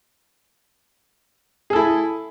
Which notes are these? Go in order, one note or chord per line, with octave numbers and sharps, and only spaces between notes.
E4 G#4 A4